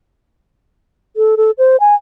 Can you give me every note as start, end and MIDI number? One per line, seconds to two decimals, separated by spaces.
1.16 1.35 69
1.37 1.51 69
1.58 1.76 72
1.80 1.95 80